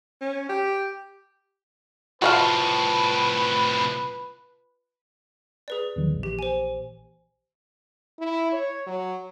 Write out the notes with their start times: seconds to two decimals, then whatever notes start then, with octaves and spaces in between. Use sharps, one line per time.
0.21 C#4
0.49 G4
2.22 C2 A2 F4 F#4 B4 D#5 F5 A5
5.68 G#4 B4 D5
5.96 E2 D#3 F#3
6.10 A#1 E3
6.23 G4
6.39 C5 G#5
8.19 E4
8.53 C#5
8.87 F#3